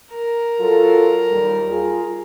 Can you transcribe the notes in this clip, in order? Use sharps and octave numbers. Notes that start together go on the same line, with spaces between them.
A#4
F#3 F4 A4
D#2 G3
F4 G#4